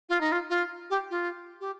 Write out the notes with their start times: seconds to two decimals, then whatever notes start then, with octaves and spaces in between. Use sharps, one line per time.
0.09 F4
0.21 D#4
0.32 F4
0.50 F4
0.90 G4
1.10 F4
1.60 G4